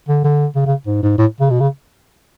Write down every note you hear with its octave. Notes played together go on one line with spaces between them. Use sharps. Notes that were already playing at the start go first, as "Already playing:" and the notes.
D3
D3
C#3
C#3
G#2
G#2
A2
C#3
B2
C#3